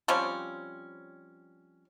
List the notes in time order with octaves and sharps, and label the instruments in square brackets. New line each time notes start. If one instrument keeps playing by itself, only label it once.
[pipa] F3 G3 C4 C#4